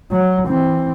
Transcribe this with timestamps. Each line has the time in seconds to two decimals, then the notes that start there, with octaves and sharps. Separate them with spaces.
0.11 F#3
0.47 E3 C4